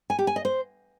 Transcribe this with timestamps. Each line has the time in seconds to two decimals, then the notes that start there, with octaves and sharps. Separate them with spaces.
0.10 G#5
0.19 G4
0.27 G#5
0.36 D#5
0.45 C5